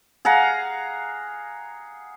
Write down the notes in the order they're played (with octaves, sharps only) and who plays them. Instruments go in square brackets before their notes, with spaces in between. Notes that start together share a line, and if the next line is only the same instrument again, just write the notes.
[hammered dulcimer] G#4 F5 F#5 A#5